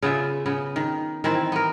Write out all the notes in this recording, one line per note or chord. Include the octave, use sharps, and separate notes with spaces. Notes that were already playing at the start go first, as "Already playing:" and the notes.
C#3 B3 F4 E5
C#3 B3
D#3
D#3 E3 C4 E4
B3 A#4